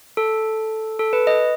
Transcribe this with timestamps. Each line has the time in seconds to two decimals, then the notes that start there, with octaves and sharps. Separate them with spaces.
0.17 A4
0.99 A4
1.13 B4
1.27 D#5